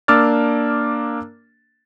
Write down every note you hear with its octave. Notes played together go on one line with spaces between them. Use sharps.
A#3 D4 D6 E6 F6 A6